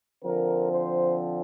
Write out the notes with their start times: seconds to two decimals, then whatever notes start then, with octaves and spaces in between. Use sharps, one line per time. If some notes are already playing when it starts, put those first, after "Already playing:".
0.23 D3 F3 C4 A#4
0.72 C5